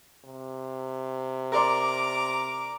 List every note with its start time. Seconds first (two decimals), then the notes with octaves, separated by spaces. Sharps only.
0.25 C3
1.52 A#4 D5 A#5 C6 D6